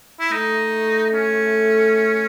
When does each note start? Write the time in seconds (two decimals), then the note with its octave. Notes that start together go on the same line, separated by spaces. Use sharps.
0.20 E4
0.32 A3 D#4
1.14 C#4